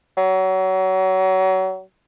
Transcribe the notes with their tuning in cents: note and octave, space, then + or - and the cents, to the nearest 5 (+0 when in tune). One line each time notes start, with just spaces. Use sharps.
F#3 +30